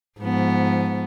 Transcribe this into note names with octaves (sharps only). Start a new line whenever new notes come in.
G#2 F3 B3